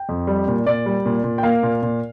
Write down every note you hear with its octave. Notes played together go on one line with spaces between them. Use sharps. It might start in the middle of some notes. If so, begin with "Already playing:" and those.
Already playing: G5
F2
G3
A#2
A#2 D5
G3
A#2
A#2
G5
A#3 F5
A#2
A#2